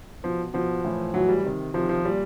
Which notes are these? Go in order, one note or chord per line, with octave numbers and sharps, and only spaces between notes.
B2 F3
B2 F3
A2 E3
A2 E3 F#3
G3
C3 D#3
C3 D#3 F3
F3
A#2 G3